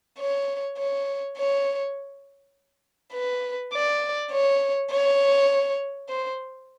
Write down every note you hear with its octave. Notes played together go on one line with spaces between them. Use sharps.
C#5
C#5
C#5
B4
D5
C#5
C#5
C5